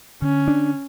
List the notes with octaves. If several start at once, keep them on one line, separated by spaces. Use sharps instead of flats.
D3 C#4
D4